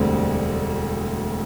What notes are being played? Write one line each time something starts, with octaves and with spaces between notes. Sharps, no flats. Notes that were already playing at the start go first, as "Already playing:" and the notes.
Already playing: E1 D2 D3 G3 C4